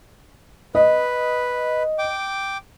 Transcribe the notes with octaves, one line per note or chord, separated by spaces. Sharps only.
B4 D#5
G5 D6